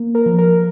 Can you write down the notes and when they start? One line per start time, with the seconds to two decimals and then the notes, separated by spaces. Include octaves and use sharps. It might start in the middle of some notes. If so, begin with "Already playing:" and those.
Already playing: A#3
0.15 A#4
0.26 F3
0.38 A#4